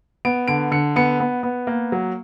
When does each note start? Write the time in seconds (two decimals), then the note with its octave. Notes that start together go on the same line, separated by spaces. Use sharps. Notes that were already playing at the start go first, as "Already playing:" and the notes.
0.25 B3 D7
0.48 D3 D7
0.71 D3 C#7
0.96 B3 C#7
1.20 B3
1.43 B3
1.67 A#3
1.92 F#3